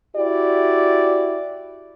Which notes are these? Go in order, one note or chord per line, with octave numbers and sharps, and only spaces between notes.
E4 F#4 G4 D5